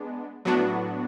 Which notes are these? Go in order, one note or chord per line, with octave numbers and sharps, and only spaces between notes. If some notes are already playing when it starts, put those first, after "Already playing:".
Already playing: G#3 B3 D4
A2 F#3 B3 D4 F#4